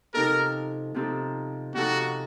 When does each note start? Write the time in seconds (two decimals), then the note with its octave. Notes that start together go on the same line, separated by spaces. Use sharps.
0.14 C3 F3 C4 D#4 A4 A#4
0.94 C3 F3 C4 D#4 A4
1.75 C3 F3 C4 D#4 F#4 A4